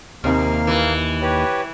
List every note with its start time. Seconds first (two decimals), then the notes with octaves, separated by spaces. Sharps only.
0.24 D#2 C3 A#3 F5 F6
0.67 E3
1.22 G4 B4 C#5